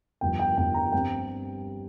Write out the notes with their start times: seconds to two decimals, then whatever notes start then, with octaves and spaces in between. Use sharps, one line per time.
0.21 G1 G2 F3 G5
0.39 G5
0.57 G1 G2 F3 G5
0.74 A#5
0.93 G2 G3 C4 G5